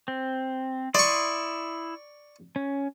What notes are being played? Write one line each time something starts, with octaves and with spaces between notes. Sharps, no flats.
C4
E4 D5 C6 C#6 D#6
C#4